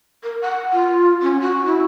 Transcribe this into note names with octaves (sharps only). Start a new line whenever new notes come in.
A#4
F#5
F4
C#4
F#4
E4